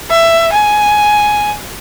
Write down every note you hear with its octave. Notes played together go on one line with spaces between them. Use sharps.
E5
G#5